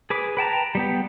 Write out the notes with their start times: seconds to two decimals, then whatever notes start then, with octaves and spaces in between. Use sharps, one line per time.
0.10 G#4 B4 D6
0.37 B4 G5 A5 A#5
0.75 G3 B3 G4